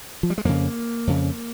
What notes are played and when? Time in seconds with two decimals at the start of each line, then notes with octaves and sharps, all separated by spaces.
0.23 F3
0.30 G3
0.38 G#3
0.45 F2 C#3 A#3
1.07 F2 C#3